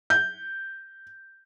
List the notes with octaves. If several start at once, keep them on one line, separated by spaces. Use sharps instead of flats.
G6